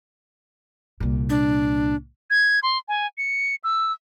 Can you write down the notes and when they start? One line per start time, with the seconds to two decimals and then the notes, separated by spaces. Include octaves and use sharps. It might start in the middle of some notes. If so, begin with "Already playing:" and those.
1.00 C2 A#2
1.29 D4
2.30 G#6
2.63 C6
2.88 G#5
3.18 C#7
3.64 E6